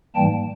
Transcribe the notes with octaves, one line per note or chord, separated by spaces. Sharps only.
G#2 E3 G3 A#3 G5 A5